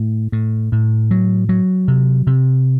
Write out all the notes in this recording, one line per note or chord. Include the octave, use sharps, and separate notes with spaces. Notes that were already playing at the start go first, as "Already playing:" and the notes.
Already playing: A2
A2
A2
F#3
F#3
C3
C3